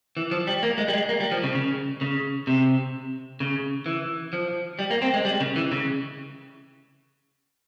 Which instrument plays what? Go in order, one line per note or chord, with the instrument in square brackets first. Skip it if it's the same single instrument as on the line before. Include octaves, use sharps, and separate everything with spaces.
[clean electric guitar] E3
F3
G3
A#3
G#3
G3
G#3
A#3
G3
F3
C#3
C#3
C#3
C3
C#3
E3
F3
G3
A#3
C4
G#3
G3
C#3
E3
C#3